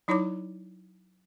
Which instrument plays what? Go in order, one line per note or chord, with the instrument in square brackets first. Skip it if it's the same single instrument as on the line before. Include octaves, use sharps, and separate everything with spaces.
[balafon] F#3 D#4 E4 C#5 A#5 D6